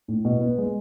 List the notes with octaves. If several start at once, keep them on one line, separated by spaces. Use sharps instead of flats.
A2
B2
B3
G#3